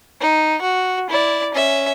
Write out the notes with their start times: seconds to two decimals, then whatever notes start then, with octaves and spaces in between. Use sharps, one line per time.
0.21 D#4
0.62 F#4
1.10 E4 D5
1.54 C#4 E5